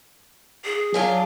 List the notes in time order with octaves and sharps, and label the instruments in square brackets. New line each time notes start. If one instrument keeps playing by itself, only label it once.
[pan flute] G#4
[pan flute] F#3 [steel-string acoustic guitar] D4 F4 G#4